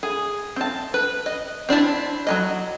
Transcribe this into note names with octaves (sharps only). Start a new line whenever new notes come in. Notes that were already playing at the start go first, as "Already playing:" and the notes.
G#4
C4 A5
B4
D#5
C4 D4 E4 A5
F#3 C#4 D#5